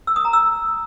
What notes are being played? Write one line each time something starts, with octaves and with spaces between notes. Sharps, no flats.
E6
D#6
A#5
E6